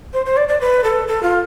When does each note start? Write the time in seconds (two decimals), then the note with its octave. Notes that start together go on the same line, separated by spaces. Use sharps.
0.13 C5
0.26 C5
0.37 D5
0.48 D5
0.61 B4
0.84 A4
1.08 A4
1.23 F4